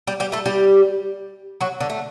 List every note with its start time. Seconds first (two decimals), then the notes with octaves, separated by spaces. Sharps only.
0.07 G3 G4
0.20 G3 G4
0.32 A3 A4
0.46 G3 G4
1.61 F#3 F#4
1.80 D3 D4
1.90 A3